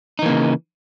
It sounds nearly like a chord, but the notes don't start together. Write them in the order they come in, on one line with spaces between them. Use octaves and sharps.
D#4 E3 A#3 C#3